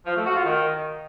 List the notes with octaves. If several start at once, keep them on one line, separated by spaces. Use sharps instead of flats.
F3
A3
F#4
F4
D#3